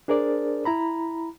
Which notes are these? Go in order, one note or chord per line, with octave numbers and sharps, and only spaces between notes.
D4 G#4 A#4 C5 D5
E4 A#5 B5